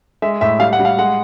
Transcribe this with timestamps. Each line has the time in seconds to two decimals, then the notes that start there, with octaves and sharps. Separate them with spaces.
0.22 G#3 E5
0.41 A2 E5
0.60 G3 F5
0.73 F#5
0.80 G3
0.85 F5
0.99 G#3 F#5